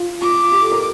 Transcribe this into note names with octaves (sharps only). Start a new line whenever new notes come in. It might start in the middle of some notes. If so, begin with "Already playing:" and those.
Already playing: F4
F4 D6
G4
A4
A#4